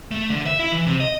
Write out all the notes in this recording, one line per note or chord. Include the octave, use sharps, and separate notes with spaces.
A3
D3
E5
E4
E3
C3
D#5